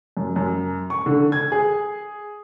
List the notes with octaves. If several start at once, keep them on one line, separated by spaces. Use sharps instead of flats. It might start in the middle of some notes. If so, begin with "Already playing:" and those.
F#2
F#2
C#6
D3
G#6
G#4